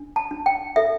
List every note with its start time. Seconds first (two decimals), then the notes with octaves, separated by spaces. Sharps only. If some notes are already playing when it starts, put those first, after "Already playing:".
Already playing: D4
0.16 A5
0.31 D4
0.46 G5
0.76 A4 E5